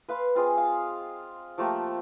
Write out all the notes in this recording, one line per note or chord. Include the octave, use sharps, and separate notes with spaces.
B4 F5 C6
C4 F4 G#4 D#5
F5
F3 A3 A#3 G4